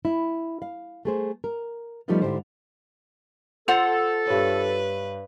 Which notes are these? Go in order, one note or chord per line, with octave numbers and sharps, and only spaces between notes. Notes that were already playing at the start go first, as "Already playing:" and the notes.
E4
F5
A3 G#4 C5
A#4
F3 G3 A3 B3 D#4 F4
G#2 D3 E4 G4 C5
F4 A4 C5 F#5 F7
G2 B4 C#5